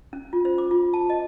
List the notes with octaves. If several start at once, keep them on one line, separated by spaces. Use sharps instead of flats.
C#4
F4
C5
D6
F4
A5
D#5